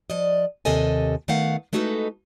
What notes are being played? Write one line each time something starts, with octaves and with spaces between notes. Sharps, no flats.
F3 D5 D#5
D#2 C3 A4 D#5 G#5
D#3 A3 B3 F5 F#5
G#3 A3 D#4 F#4 A4 B4